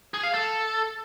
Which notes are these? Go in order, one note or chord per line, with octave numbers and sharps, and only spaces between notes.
G#4
F5
A4